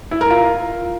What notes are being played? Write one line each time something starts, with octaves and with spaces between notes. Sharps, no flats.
E4
A#4
F4